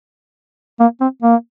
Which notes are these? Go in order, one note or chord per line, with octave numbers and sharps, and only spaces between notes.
A#3
C4
A#3